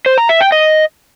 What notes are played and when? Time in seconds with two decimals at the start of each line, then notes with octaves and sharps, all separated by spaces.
0.06 C5
0.18 A#5
0.29 E5
0.41 G5
0.52 D#5